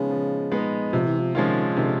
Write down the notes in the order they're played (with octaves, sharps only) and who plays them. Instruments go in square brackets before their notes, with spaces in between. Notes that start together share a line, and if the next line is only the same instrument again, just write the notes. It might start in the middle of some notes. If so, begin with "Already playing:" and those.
Already playing: [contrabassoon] C#3 [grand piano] F3 G#3 B3 D#4
[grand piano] F3
G#3 B3 D#4
[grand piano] C3 [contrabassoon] F3
[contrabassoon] E3
F3
[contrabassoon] D#3 [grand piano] F3 G#3 C#4 F4
[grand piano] C3 [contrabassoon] D#3
[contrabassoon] D3